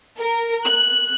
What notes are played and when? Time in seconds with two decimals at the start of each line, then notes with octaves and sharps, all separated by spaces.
0.20 A#4
0.66 F#6